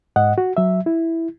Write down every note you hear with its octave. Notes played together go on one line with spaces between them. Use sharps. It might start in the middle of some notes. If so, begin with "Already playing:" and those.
G#2 D#5 F#5
F#4
F#3 E5
E4